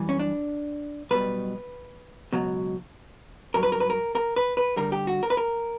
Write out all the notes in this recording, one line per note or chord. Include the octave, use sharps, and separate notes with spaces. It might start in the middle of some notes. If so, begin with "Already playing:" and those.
Already playing: F#2 E3 G3
C#4
D4
B1 B2 G3 B4
C#2 B2 F#3
G2 F#3 A#4
B4
A#4
B4
A#4
A#4
B4
B4
D2 D3 G3 A#4
G4
F#4
A#4
B4
A#4